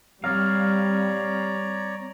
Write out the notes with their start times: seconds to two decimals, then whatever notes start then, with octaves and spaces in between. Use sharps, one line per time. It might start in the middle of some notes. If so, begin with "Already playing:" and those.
0.24 G3 C4 C#5 D5 F5 A#5